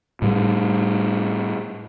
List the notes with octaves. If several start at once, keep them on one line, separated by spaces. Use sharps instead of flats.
A2 G3